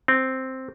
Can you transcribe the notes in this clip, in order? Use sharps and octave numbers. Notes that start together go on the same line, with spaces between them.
C4